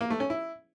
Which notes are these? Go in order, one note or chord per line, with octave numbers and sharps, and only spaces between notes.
A#3
A3
C#4
E4